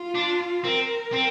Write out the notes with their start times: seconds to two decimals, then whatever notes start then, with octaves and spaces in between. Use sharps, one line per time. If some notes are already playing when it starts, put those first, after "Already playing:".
Already playing: F4
0.15 D4
0.64 C4 A#4
1.12 C4